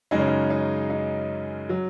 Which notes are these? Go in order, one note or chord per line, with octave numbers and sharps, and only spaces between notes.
F#2 C#3 G#3 D#4
C#4
D#4
D#4
D#4
F#3